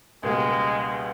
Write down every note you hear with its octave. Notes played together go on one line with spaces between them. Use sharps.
C#2 B2 G3 G#3 A#3